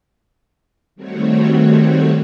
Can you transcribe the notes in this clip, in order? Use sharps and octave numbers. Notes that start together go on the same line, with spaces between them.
D#3 G3 A3 C4 F#4 C#5